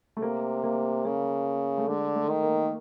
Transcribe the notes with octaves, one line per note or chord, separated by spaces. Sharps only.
A3
C3 A#3
A#3
C#3 A#3
A3
D3 G#3
A3
D#3
A#3